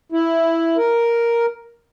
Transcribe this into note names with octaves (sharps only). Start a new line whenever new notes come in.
E4
A#4